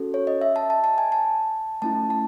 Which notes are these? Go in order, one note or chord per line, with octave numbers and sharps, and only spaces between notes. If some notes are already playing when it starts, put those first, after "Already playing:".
Already playing: C#4 F#4 A4
C#5
D#5
E5
A5
A5
A5
G#5
A5
A3 C#4 E4 A5
A5